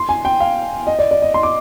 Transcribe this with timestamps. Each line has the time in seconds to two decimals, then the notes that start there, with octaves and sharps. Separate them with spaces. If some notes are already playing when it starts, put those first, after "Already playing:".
Already playing: C6
0.09 G#5
0.25 G5
0.40 F5
0.87 D#5
0.99 D5
1.11 D5
1.22 D#5
1.34 C6
1.43 D6